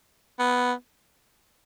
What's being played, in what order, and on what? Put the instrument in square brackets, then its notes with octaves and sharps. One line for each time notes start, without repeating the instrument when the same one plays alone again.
[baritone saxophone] B3